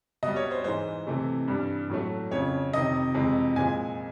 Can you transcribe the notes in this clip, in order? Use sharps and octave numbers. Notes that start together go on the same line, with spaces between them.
B2 G3 D#5
C#5
C5
G#2 E3 G#3 C5
C3 E3 A3
G2 E3 G3
A2 F#3 A3
F2 C#3 F3 C#5
F2 C3 D#3 D#5
F2 C3 E3 G#3
A#2 F3 G#3 G#5